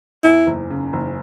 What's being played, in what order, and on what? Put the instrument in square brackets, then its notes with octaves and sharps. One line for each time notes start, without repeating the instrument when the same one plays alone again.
[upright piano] E2 [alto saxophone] E4
[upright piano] F#1
C#3
F#1